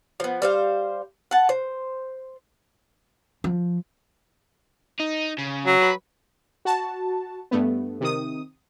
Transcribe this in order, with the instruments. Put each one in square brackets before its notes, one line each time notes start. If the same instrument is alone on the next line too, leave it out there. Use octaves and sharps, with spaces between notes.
[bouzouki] F3 B3
G3 C5 F5
F#5 A5
C5
[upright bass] F3
[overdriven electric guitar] D#4
C#3
[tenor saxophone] F#3
[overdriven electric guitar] B4
[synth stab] F#4 A5
G2 A3 B3
C3 D#3 D#6